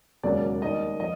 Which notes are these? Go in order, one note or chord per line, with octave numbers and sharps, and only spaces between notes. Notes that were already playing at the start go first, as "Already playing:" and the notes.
E1 D#2 C#3 F#3 D5
D#2 D#3 G3 D#5
F3 D#5